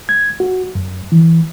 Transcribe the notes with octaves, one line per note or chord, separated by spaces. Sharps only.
G#6
F#4
F#2
E3